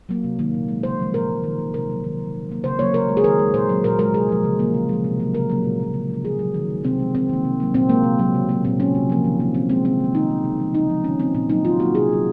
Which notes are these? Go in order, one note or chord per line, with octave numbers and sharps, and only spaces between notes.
F#3 A#3
C3
D#3 F#3 A#3
A#2
G#3
C#3 C5
F3 G#3
A#2 A#4
G#3
D#3
A#3
C3 A#4
F#3 A#3
D#3
F#3 A#3
A#2
F#3 A#3
C#3 C5
F#3 A#3 C#5
C#3 A#4
G#3
G#4
D#3 A#4
G#3
A#2 C5
F#3 A#3
A#2 A#4
G#3 A#4
C3 G#4
F3 G#3
C#3
F3 A#3
C#3
F3 G#3
C3
F#3 A#3
C#3 A#4
F#3 A#3
A#2
F#3 A#3
C#3
F3 A#3
D#3 G#4
F#3 A#3
D#3
G#3
C3 C4
F3 G#3
C3 C4
D#3 A#3
C3
F#3 A#3
A#2 C4
G#3 A#3
C3
F#3 A#3
C#3
F#3 A#3
A#2 C4
F#3 A#3 C#4
C3
F3 A#3
D#3
A#3
A#2 C4
G#3 C4
C3 C4
D#3 A#3
D#3 D#4
A#3
C#3
F3 G#3
C#3 D#4
F3 G#3
D#3 C#4
A#3 C4
A#2 C4
F#3 A#3 D#4
D#3 F4
F#3 A#3 F#4
C3 G#4
F#3 A#3